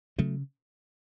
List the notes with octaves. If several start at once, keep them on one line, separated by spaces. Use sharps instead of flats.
C#3 F#3 A3